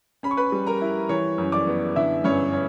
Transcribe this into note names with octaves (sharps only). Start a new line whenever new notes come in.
C#4 B5
C#6
B4 B5
G3
A#4 A#5
E4
E3 C#5 C#6
F#2
D5 D6
B3
D3 E4 E5
G2 C#4 C#5
C#5